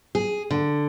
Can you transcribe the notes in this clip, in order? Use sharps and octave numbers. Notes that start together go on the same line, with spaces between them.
G#4
D3